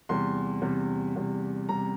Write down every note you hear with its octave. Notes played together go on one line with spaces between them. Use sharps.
E2 C3 G3 C6
E2 C3 G3
E2 C3 G3
C3 G3 A#5